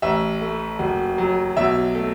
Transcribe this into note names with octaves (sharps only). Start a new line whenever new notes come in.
A1 E5
A3
F#1
F#3
B1 E5
A3